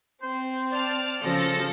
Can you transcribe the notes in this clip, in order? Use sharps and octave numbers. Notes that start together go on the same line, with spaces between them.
C4 C5
D5 A5 F6
C#3 F3 A4 A#6